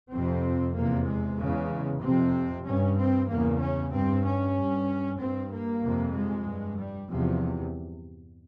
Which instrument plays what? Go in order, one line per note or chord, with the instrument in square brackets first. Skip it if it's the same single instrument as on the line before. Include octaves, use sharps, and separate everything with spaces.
[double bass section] F2 C3 C4
E2 C3 A#3
G#3
E2 C#3
F2 C3 C4
G2 C#4
C4
E2 C#3 A#3
C#4
G2 C4
C#4
G2
G2 C4
A#3
F2 C3
G#3
G2
G3
E2 C3 F3